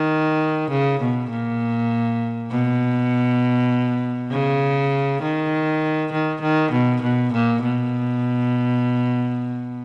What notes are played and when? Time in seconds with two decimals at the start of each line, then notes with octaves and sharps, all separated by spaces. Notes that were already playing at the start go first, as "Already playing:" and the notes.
Already playing: D#3
0.71 C#3
1.01 B2
1.31 A#2
2.51 B2
4.31 C#3
5.22 D#3
6.12 D#3
6.42 D#3
6.72 B2
7.02 B2
7.33 A#2
7.63 B2